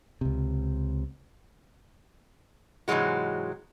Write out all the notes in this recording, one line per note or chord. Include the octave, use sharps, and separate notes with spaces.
C#2 C3
G#2 C3 E3 F#3 G#3 F#4